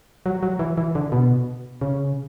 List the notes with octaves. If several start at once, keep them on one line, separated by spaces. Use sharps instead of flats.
F#3
F#3
E3
E3
D3
B2
C#3